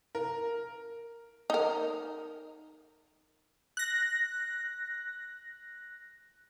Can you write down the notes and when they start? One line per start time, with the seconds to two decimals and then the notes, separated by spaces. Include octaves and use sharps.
0.15 A#4
1.50 D#4 A#4
3.77 F#6 A#6